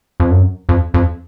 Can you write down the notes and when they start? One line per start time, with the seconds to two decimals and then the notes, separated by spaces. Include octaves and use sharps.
0.20 F2
0.31 F#2
0.69 F2
0.94 F2